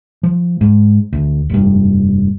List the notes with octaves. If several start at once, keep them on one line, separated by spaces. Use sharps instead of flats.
F3
G#2
D2
F1 G2